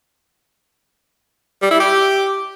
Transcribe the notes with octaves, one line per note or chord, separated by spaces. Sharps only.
G3
E4
G4